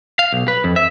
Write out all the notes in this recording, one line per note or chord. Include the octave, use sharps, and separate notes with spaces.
F5
B1
B4
F2
E5